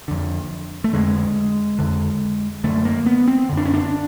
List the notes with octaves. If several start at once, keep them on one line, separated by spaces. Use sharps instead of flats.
F2 D3
A3
F2 D3 G#3
F2 D3
F#2 D3 A3
A#3
B3
C4
F#2 D3
D4
C#4
D4